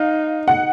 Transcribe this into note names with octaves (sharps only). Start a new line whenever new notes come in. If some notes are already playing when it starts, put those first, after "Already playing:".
Already playing: D#4 F5
F#5